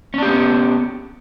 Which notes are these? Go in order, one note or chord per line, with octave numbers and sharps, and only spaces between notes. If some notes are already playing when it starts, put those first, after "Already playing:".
B3 C#4 D4 G4